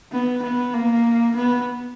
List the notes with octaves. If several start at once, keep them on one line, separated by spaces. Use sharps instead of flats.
B3
B3
A#3
B3